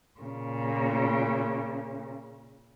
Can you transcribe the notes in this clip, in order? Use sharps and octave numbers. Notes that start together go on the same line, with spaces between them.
A#2 C#3